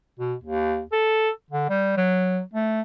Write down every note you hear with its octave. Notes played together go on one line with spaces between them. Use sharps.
B2
D#2
A4
D3
G3
F#3
A3